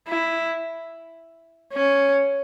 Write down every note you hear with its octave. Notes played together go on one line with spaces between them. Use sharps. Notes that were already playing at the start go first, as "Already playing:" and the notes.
E4
C#4